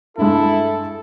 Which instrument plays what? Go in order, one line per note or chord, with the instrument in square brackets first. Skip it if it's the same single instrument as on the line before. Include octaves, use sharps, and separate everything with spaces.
[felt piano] G2 G#3 [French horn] E4 [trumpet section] A4